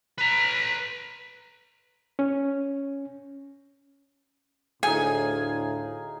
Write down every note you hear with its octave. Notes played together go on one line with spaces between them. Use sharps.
B4 A#5
C#4
D2 A2 D#4 G#4 F5 G#5